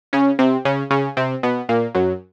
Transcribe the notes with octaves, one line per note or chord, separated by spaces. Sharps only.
C#3 C#4
C3 C4
C#3 C#4
C#3 C#4
C3 C4
B2 B3
A#2 A#3
F#2 F#3